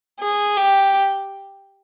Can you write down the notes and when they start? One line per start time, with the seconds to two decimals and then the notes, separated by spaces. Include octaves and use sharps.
0.20 G#4
0.57 G4